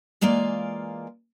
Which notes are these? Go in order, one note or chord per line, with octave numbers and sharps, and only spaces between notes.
E3 G#3 A#3 F4 D5